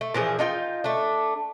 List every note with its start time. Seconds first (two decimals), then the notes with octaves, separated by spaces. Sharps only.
0.01 A3
0.14 A#2 E3 F3 G#4
0.39 D4 D#4 F4 G5
0.84 A3 D4